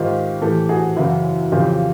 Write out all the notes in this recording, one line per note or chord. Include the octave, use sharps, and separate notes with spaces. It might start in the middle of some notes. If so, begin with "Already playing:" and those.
Already playing: G#2 D#3 F4 G4
A2 E3 G4 A4
F#4 G#4
F#2 C#3 E3 E4 F#4
F2 C#3 E3 F4 G4